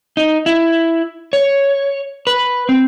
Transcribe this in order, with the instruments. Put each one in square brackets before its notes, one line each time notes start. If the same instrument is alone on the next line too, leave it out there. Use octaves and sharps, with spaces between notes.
[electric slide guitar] D#4
E4
C#5
B4
C4